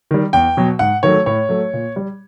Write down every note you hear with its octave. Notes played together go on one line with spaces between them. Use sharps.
D#3 G3
E2 G5
B2 F#3
G#2 F#5
D#3 F#3 A3 C#5
A2 C#5
F#3 A3
A#2
G3